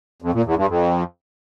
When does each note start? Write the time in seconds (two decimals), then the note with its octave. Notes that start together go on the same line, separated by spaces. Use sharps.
0.22 F2
0.34 A#2
0.45 E2
0.56 G2
0.68 F2